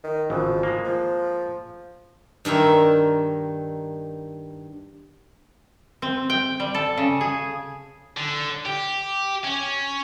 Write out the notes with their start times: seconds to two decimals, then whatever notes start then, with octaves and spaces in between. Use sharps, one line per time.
0.04 D#3
0.30 G#1 C#3 E3 F3
0.63 G#3 A#3
0.85 F3
2.45 G2 D#3 A#4 E5
6.02 C4
6.30 G5
6.60 G3
6.74 A4
6.97 C#3
7.21 G#4
8.17 D3
8.66 G4
9.44 C#4